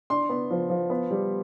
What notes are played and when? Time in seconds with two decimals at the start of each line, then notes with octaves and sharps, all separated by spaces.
0.10 D4 C6
0.30 B3
0.50 F3
0.70 F3
0.90 B3
1.11 G3